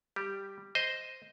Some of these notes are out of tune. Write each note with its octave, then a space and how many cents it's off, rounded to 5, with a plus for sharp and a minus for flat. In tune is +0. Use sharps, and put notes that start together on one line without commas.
G3 +0 G4 +0
C5 -5 D#5 +0